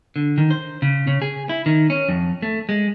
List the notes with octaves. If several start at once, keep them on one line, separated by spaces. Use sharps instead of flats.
D3
D#3
C5
C#3
C#3
G#4
E4
D#3
C#4
F2
A3
G#3